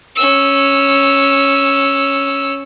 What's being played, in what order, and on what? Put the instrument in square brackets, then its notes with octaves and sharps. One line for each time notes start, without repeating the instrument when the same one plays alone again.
[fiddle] C#4 E6